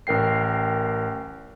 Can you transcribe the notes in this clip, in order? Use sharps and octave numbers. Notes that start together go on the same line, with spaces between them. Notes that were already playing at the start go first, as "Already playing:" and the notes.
A1 A#4 G5 C7